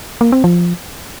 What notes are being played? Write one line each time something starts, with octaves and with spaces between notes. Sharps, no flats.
A#3
C4
F3